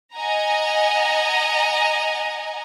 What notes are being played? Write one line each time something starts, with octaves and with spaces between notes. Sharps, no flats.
D#5 F#5 G#5 A#5